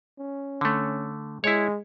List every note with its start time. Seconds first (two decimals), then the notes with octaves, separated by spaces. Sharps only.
0.19 C#4
0.61 D3 A3
1.44 G#3 E4 C#5